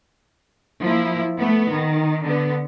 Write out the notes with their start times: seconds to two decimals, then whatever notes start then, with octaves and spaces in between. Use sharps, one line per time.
0.83 F3 A#3 E4
1.38 A3 B3
1.70 D#3
2.25 D3 B3